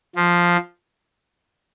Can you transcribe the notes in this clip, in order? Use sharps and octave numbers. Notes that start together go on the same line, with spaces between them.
F3